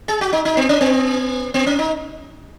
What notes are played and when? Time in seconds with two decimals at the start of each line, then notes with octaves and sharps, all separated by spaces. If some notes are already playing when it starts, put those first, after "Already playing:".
0.08 G#4
0.21 F#4
0.33 D#4
0.45 D#4
0.57 B3
0.69 C#4
0.81 B3
1.54 B3
1.67 C#4
1.79 D#4